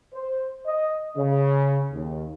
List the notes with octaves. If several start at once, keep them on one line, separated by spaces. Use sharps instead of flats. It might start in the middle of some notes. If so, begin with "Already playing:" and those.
C5
D#5
C#3
D#2